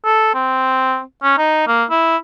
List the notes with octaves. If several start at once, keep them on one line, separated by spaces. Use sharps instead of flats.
A4
C4
C#4
D#4
A#3
E4